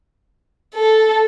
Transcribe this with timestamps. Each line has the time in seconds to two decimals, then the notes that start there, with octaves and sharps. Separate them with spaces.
0.75 A4